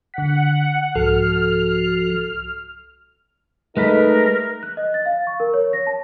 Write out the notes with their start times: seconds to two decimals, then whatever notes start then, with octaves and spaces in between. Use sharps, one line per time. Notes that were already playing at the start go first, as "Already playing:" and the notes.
0.14 D3 F#5 B6
0.96 C2 G#2 F3 F#4 A4 F6
3.77 G#3 A3 D#4 A#4 B4 B6
4.63 F#6
4.77 D#5
4.94 A6
5.06 F5
5.27 C#6
5.40 A#4
5.54 C#5
5.73 A#6
5.87 A5